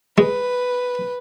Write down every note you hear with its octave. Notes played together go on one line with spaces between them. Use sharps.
G#3 B4